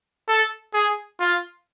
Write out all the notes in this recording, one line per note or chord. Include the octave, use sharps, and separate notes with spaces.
A4
G#4
F4